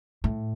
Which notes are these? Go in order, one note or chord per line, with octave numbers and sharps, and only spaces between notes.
A2